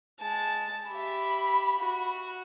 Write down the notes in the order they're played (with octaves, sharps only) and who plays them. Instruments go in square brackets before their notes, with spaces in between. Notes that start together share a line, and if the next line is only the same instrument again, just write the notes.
[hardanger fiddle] G#3 A5
[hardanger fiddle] G4 E5 [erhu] B5
[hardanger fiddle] F#4